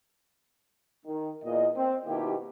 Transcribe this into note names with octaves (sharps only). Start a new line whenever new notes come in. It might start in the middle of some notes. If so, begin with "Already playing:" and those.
D#3
E2 A#2 D#5
C4
B2 D#3 A#3 E4 F4 G4